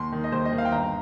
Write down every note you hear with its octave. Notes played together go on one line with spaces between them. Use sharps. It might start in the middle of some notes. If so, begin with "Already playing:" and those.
Already playing: D#2 C6
D#3
D#5
D#2 C5
D#5
D#3
F5
G5
G1 A#5